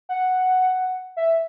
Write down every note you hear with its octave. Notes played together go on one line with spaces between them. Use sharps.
F#5
E5